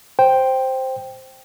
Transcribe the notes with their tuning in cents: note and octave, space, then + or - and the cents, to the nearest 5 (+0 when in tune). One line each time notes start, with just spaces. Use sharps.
C5 +0 G5 +0